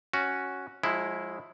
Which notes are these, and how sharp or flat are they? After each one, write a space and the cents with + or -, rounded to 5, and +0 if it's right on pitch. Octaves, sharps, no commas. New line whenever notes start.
C#4 +0 F#4 +0
F3 +35 G#3 +0 E4 +0